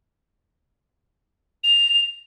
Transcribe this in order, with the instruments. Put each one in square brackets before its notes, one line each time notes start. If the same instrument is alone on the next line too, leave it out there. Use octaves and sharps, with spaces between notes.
[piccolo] F7